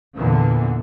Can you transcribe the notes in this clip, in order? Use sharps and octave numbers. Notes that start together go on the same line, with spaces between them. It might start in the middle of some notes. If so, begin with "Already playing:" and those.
E2 A#2 D3 E3